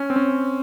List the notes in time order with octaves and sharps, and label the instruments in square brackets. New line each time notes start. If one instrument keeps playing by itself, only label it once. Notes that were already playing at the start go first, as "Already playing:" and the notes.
Already playing: [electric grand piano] C#4
C4
C#4